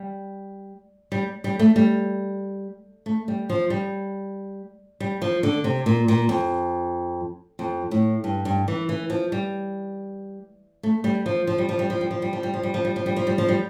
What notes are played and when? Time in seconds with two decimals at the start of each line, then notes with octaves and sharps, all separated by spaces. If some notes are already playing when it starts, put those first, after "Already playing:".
Already playing: G3
1.12 G3
1.44 G3
1.59 A3
1.76 G3
3.06 A3
3.28 G3
3.49 F3
3.70 G3
5.00 G3
5.22 F3
5.43 D3
5.64 C3
5.86 A#2
6.08 A#2
6.29 F2
7.59 F2
7.91 A2
8.24 G2
8.45 G2
8.68 E3
8.89 E3
9.10 F3
9.32 G3
10.83 A3
11.04 G3
11.26 F3
11.47 F3
11.58 G3
11.69 F3
11.79 G3
11.90 F3
12.01 G3
12.11 F3
12.22 G3
12.33 F3
12.43 G3
12.54 F3
12.63 G3
12.74 F3
12.85 G3
12.96 F3
13.06 G3
13.16 F3
13.27 G3
13.38 F3
13.49 G3